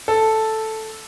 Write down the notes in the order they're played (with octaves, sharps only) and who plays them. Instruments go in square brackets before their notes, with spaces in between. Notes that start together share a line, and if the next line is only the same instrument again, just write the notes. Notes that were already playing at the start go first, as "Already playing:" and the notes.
[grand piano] A4